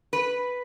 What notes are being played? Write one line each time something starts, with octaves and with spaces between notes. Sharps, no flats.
B4